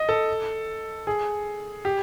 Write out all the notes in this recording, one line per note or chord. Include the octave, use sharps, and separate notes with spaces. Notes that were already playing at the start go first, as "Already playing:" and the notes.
Already playing: D#5
A4
G#4
G4